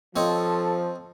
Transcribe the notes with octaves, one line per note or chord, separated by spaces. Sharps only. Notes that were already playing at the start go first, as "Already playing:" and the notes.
F3 C4 A4 C#5 D#5